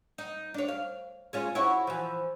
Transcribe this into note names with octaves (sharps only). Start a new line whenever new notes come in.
D#4
D4 C#5
F5
G#3 C#4 F4
E4 F#4 C#5
E3 F3